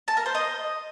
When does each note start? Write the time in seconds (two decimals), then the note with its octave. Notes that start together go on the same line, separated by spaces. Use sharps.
0.08 A5
0.17 A#4
0.26 C5
0.35 D#5